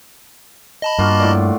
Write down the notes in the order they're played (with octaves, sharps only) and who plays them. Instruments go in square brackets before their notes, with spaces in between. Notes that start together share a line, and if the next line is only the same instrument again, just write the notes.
[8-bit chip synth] D#5 A5 B5
[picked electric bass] G2 [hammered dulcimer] A#3 F4 F#4
[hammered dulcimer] A2 D5